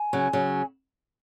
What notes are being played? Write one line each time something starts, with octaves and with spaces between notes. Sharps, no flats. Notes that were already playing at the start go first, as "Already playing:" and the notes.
Already playing: G#5
C#3 F#3
C#3 F#3